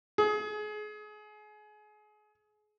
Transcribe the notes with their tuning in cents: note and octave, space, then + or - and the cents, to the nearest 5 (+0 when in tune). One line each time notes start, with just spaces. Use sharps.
G#4 +30